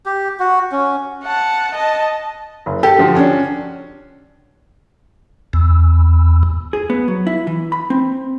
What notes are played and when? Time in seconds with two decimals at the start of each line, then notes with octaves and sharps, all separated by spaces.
0.06 G4
0.40 F#4
0.72 C#4
1.24 F#5 A5
1.75 D#5 A5
2.66 F#1
2.83 G4 A4
2.98 D3 F3 F#4
3.16 C#4 D4
5.53 E2
6.73 G#4
6.90 B3
7.08 F#3
7.27 E4
7.47 E3
7.72 B5
7.90 C4